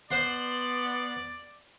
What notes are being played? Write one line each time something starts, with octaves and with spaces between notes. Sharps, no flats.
B3 C5 D5 F#5 C6